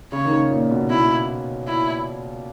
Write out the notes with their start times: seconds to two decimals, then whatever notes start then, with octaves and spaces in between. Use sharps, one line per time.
0.12 C#3 C#5
0.25 D#3
0.31 C#3
0.50 A#2
0.71 B2
0.90 B2 E4
1.68 E4